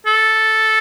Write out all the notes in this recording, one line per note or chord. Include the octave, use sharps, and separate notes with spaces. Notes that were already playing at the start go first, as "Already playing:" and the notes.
A4